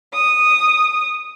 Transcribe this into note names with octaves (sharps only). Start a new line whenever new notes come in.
D#6